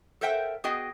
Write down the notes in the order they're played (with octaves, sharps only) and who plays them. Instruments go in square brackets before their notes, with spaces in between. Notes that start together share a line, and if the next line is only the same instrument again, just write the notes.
[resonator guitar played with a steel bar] A4 A#4 C5 E5 F#5 G5
B3 F#4 G#4 D#5 G5